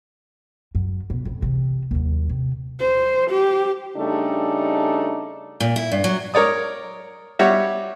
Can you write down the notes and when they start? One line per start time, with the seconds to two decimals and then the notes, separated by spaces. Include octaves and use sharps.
0.75 F#2
1.10 B2
1.25 B1 F2
1.42 C3 E3
1.91 D#2 F#3
2.29 C3
2.80 C5
3.30 G4
3.97 C#3 G3 A3 D4 D#4
5.60 A#2
5.76 E4
5.92 G2
6.04 F#3
6.34 A#4 C#5 D5 D#6
7.39 G3 F#4 C#5 E5